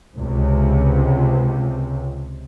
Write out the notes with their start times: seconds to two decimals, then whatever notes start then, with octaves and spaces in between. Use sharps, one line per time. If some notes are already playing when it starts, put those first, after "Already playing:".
0.18 C#2 C3